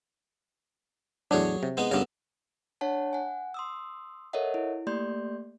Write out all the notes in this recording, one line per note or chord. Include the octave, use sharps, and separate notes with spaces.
E2 A2 F#3 D4 G#4 C#5
C3
G#3 B3 D#4
G2 C#3 A3 B3 A#4
D4 C#5 F#5 A5
F#5 G#5
C6 D#6 E6
A4 A#4 C#5 D#5 E5 F#5
E4
A3 A#3 G4 D5 C6 G6